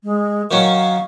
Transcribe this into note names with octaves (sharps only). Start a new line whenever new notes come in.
G#3
D#3 F#3 C#4 F5